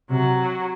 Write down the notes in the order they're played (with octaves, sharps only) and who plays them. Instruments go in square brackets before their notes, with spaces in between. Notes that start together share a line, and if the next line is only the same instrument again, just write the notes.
[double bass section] C3 [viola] F#3